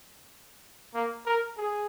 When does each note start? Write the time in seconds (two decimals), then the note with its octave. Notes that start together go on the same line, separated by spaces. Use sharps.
0.94 A#3
1.26 A#4
1.57 G#4